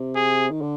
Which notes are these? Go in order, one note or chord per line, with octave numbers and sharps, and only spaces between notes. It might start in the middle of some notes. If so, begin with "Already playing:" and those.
Already playing: C3
G#4
D#3
D3